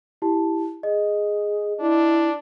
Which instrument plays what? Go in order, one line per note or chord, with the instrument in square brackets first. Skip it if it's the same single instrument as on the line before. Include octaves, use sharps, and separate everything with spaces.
[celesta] E4 G4 A5
[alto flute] G#4 [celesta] D#5
[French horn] D4 [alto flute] E4